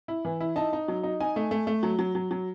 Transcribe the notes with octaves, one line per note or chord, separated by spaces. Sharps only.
E4
E3
E4
D#4 A5
D#4
F#3
D#4
D#4 G#5
A3
A3
A3
F#3
F#3
F#3
F#3